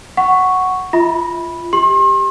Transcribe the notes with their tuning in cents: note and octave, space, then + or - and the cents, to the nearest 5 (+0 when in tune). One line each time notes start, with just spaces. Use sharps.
F#5 +0 C#6 +0
F4 -15 E5 -35 B5 -10
G4 +5 C6 +40